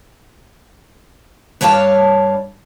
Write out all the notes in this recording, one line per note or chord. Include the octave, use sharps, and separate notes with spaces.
G2 D4 C#5 F5 A5